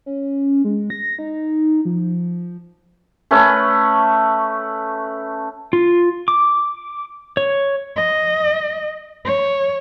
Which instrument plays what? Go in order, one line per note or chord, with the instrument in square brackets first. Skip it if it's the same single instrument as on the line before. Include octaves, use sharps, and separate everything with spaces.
[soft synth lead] C#4
G#3
A#6
D#4
F3
[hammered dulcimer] A3 C#4 B4
[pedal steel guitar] F4
D6
C#5
[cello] D#5
C#5